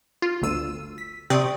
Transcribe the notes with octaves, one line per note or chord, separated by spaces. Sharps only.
F4
G1 D2 E6 D#7
B6
C3 C4 D5 C#6 D#6